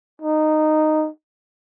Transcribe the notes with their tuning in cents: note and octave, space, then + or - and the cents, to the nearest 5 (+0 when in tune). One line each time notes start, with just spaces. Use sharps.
D#4 -10